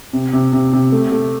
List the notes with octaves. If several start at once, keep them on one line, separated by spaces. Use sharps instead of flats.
C3
C3
C3
C3
A3
A3